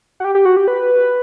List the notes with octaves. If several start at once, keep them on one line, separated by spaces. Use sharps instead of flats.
F#4
G4
G4
F#4
G4
B4